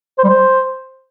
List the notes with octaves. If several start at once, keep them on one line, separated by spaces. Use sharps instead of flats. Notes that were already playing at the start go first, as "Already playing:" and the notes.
C5
G3
C5